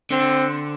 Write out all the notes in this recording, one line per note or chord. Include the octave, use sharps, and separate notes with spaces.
D3 C4